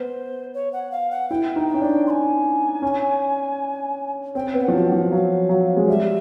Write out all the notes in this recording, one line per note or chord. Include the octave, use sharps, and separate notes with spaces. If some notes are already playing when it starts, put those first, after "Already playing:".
Already playing: B3 C5
C#5
F#5
F5
F#5
E4 G5
D#4
G5
C#4
D4
C6
G#5
C#4
C4 G5
B3
F#5
F3
F#3
G5
F3 F#5
F#3 F5
F#3
G#3
G3 E5